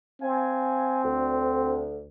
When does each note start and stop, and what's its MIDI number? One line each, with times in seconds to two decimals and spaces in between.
0.22 1.84 60
0.22 0.99 77
0.22 0.99 80
1.03 2.03 38